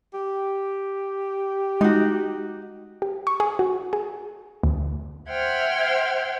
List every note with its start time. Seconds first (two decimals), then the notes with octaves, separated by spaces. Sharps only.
0.14 G4
1.81 G#3 D#4 F#4
3.02 G4
3.27 C#6
3.40 G#4
3.59 F#4
3.93 G#4
4.64 D2
5.30 C5 E5 F#5 G5 F6 G#6